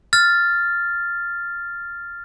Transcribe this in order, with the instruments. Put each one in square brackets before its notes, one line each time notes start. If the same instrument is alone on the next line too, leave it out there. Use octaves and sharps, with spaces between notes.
[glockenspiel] F6 A6